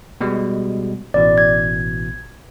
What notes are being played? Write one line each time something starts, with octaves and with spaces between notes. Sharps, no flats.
B2 G3 G#3
A1 B2 E3 D5
G#6